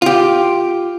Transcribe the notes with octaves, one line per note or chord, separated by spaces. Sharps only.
F4 G4